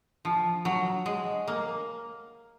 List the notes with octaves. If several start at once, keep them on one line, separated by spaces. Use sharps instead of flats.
F3
F#3
G#3
A#3